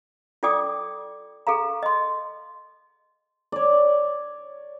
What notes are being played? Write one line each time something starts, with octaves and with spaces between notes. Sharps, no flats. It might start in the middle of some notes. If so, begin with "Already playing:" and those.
F4 A4 D5 G5 D6 D#6
G#4 A4 F5 A#5
D#5 C6
C#5 D5